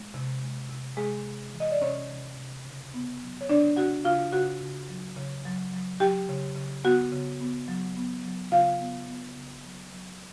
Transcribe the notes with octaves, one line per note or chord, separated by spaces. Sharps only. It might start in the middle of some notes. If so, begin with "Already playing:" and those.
Already playing: G#3
C3
G#3
C3
C3 G#3 G#4
C3
E3
D#5
D5
C3 C#4 C#5
C3
C3
C#3
B3
F#3
C#5
C#3 D4 D5
C#3 F#4 F#5
C#3 F4 F5
C#3 F#4 F#5
C#3
F#3
C#3
F#3
F#3
F#3 G4 G5
C#3
C#3
B3 F#4 F#5
C#3
B3
F#3
B3
F#3
C#3 F4 F5
B3
B3
C#3
F#3
F#3